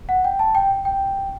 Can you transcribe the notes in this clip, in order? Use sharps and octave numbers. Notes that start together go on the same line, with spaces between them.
F#5
G5
A5
G5
G5